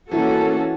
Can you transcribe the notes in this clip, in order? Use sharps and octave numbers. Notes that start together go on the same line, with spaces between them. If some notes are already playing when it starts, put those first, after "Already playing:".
E3 A#3 C#4 F#4 A4